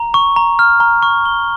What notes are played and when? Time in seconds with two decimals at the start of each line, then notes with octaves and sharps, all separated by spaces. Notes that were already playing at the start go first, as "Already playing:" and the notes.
Already playing: A#5
0.14 C#6
0.36 A#5
0.59 F6
0.80 A#5
1.03 C#6
1.25 G7